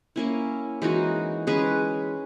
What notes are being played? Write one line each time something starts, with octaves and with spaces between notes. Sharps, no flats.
A#3 C#4 E4
E3 G#3 D#4 F#4
G#3 C#4 G#4 B4